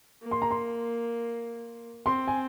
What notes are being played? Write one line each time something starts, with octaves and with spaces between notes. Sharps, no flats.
A#3
C6
A#5
C6
C4 C6
G#5